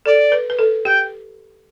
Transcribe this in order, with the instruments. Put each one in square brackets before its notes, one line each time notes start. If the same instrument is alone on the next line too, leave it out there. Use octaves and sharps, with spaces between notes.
[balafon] A4 [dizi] D5
[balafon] B4
B4
A4
[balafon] G4 [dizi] G5